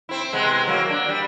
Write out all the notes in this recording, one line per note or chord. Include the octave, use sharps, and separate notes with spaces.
C4 E4
C3 G#3 B3
F#3 A#3
D4
G3